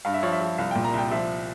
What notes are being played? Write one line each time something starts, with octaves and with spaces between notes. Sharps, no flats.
G2 F5
E5
F3 C#5
E5
F3
C2 F5
A#2 G5
A#5
C2 G5
F3 E5